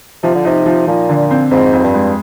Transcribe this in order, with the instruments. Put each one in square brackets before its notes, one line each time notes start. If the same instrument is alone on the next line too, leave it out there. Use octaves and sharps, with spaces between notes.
[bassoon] C3 [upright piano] F3
[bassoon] D3
[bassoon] C3 [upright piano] D#4
[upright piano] F3
[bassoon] A#2 [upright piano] F3
[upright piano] D3
C4
[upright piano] F2 [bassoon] G#2
[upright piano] F2
[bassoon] G#2
G2
[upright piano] G#3